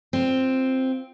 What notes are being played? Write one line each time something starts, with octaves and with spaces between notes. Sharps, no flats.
C4 F4